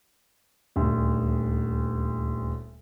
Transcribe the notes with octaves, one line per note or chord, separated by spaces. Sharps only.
D#1 D2